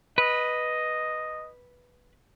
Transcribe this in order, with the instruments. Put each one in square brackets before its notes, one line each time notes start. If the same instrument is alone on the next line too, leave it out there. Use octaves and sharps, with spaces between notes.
[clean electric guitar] B4 [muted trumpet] D#5